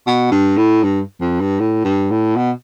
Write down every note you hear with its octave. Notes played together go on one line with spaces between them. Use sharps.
B2
G2
A2
G2
F2
G2
A2
G2
A2
B2